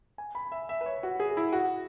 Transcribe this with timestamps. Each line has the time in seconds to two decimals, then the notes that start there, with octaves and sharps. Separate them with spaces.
0.18 G#5
0.35 B5
0.52 E5
0.69 E5
0.81 B4
0.86 C#5
1.03 F#4
1.20 G#4
1.37 E4
1.53 F#4